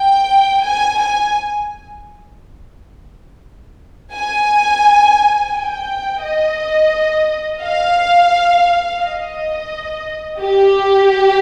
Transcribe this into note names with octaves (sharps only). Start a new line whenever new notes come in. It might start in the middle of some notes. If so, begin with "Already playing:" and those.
Already playing: G5
G#5
G#5
G#5
G5
D#5
F5
D#5
G4